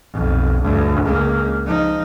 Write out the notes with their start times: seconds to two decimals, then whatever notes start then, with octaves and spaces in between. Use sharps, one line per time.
0.12 B1 F2
0.62 D2 G2
1.05 C#2 A#3
1.66 F3 D#4